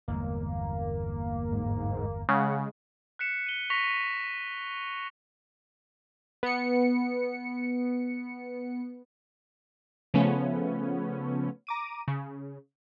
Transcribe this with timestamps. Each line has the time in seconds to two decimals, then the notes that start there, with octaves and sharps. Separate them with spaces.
0.08 G1 E2 G#3 A#3
1.52 G#2
2.29 C#3 G#3 F#5
3.19 F#6 B6 C#7 E7
3.46 D#7 G7
3.70 C#6 A#6 B6 F7
6.43 B3 C#7
10.14 C#3 F3 A3 B3 C#4
11.67 A#5 D6 D#7
12.08 C#3